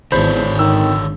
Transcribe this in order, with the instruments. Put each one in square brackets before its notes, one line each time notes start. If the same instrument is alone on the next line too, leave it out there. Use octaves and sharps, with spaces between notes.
[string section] G#1 [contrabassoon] E2 [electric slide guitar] D3 D4 C#5 [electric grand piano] C5 B5 G6
[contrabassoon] D#3 [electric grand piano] E6